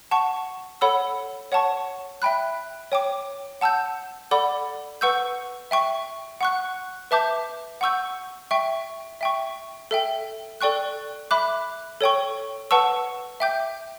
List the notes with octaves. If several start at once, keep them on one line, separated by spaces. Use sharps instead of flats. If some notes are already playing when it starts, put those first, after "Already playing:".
F#5 A5 C#6
A4 C#5 F#5 B5 E6
C#5 F#5 A5 C#6
E5 G5 B5 F#6
C#5 G5 D6
F#5 A5 E6 G6
A4 D5 F#5 B5 D6
B4 F#5 C#6 E6 G6
E5 G5 C#6
F#5 C#6 F#6
B4 E5 A5 D6 G6
F#5 C#6 E6 G6
E5 G5 C#6
E5 G5 C#6
A4 E5 G5
A4 D5 G5 C#6 F#6
E5 B5 D6 F#6
A4 C#5 G5 C#6
B4 F#5 A5 C#6 E6
E5 G5 D6 G6